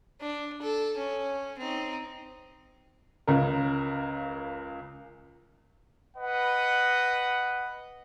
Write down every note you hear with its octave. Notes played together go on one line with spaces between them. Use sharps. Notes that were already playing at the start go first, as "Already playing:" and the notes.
D4
A4
C#4
C4 D#4
C#2 C#3 A#4
B4 D#5 F#5